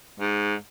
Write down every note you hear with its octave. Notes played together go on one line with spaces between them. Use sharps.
G#2